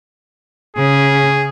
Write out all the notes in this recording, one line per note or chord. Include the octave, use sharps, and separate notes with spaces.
C#3 G#4